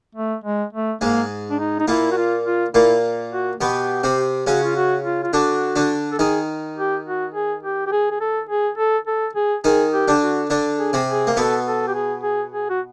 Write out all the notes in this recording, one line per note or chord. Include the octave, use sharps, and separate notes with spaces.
A3
G#3
A3
G#2 G#3 A#3
D4
D#4
D#4
A#2 A#3 E4
F#4
F4
F4
A#2 A#3 E4
F#4
B2 B3 G4
C3 C4
C#3 C#4 F#4
F4
F#4
F4
F4
D3 D4 F#4
D3 D4
A4
D#3 D#4 G#4
G4
F#4
G#4
G4
G4
G#4
G#4
A4
G#4
A4
A4
G#4
D#3 D#4 G#4
G4
D3 D4
F#4
D3 D4
G#4
C3 C4
G#4
A#3
B2 B3 A4
A4
G4
G#4
G#4
G#4
F#4